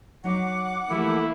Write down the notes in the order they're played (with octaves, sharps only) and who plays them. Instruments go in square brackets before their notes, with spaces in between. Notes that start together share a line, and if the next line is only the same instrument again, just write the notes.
[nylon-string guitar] F#3 D#4 D#5 [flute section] F#5 D6
[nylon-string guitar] E3 F3 G4 [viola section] A3 A#3 [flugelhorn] E4